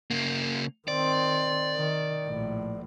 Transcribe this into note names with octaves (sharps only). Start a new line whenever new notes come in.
C#3 A#3
D#3 C4 D5
D#3
A#1 A2